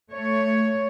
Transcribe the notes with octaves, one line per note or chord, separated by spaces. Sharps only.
A3 C#5